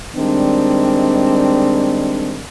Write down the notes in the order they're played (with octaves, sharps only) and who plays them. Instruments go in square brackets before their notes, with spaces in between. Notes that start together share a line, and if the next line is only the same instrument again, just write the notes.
[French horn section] D#3 G3 G#3 C4 D4